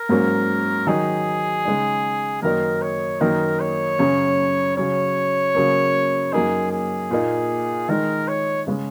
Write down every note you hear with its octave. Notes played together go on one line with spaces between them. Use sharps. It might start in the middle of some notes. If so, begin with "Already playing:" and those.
Already playing: A#4
G#2 F#3 A#3 C#4
D#3 F#3 D#4 G#4
C#3 G#3 D#4
F#2 D#3 A#3 D#4 A#4
C#5
F#2 D#3 A#3 D#4 A#4
C#5
F#2 C#3 F#3 C#4
C#3 F#3 C#4 C#5
C#3 F#3 A#3 C#4
F#2 F#3 A#3 D#4 G#4
G#4
A#2 A#3 D#4
D#3 G#3 D#4 A#4
C#5
C#3 G#3 C#4